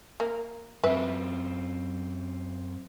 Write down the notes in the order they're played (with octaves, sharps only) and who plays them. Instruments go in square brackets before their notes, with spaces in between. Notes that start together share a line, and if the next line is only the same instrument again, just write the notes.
[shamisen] A#3
[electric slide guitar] F#2 C4 [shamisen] B4 E5